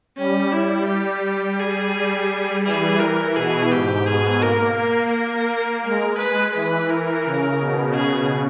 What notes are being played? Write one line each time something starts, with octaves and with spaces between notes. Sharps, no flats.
G3 C#4
G3 E4
G3 G4
G#4
G3
E3 G#4
A#4
B2 G#4
G#2 G4
B2 G#4
A#3 A#4
A#4
A#3 A#4
G#3 A#4
B4
E3 B4
A#4
C#3
B2
G#4